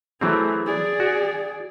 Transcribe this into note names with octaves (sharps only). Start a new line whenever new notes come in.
E3 F#3 A3 C4 G#4
G#4 D5
F#4